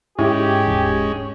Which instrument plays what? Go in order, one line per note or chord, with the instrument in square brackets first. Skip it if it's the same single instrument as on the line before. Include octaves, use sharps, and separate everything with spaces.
[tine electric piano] G#2 [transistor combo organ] G#3 C#4 [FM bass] E4 [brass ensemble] G4
[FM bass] D#1